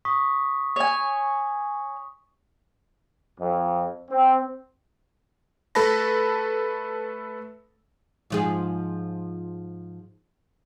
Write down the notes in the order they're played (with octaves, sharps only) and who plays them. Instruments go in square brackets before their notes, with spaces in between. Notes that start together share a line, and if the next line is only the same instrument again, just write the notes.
[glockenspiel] C#6 D#6 B6
[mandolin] C#5 G#5
[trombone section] F2
C4
[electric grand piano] A3 A4 B4 A5 B5 A#6
[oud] G#2 F3 G#4